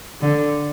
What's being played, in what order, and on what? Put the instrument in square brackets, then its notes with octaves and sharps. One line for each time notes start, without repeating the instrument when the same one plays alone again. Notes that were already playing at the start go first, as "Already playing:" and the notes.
[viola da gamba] D3